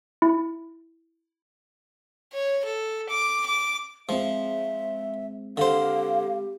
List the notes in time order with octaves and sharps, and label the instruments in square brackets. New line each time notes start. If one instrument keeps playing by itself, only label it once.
[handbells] E4
[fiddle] C#5
A4
D6
D6
[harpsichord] F3 [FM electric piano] G#3 C4 [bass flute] E5
[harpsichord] D3 C5 [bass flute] G4 [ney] F5